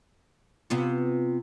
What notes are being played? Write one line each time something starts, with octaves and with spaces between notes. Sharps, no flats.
C3 B3 F4